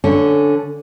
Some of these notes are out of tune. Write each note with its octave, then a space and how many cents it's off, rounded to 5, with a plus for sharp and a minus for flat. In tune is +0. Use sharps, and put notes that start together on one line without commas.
D3 -5 C#4 +0